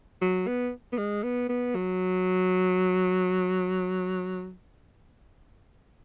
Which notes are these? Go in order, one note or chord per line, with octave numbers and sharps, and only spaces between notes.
F#3
B3
B3
G#3
B3
B3
F#3